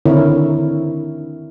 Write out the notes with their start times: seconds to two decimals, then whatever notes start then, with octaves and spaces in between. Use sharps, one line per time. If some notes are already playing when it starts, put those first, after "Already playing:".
0.06 D3 D#3 C4 E4 A#4 C#5